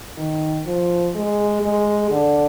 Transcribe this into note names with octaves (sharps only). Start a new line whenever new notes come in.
D#3
F3
G#3
G#3
D3